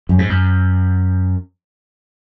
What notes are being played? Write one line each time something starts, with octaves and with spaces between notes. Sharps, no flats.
F#2
G#2
F#2